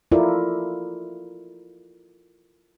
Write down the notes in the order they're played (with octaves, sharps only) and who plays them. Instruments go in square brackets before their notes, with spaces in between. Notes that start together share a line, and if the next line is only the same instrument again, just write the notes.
[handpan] E4 F4 A4 A#4 D5